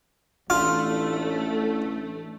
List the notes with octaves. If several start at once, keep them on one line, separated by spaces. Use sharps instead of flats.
A1 A3 D4 F4